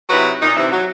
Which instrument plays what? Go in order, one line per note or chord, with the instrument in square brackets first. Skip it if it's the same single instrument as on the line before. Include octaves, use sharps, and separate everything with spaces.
[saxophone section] C3 F#3 D#4 E4 F#4 B4
A#2 D#4
C3 E3
F#3